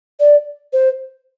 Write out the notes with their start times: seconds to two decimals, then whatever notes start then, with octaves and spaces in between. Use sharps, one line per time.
0.19 D5
0.72 C5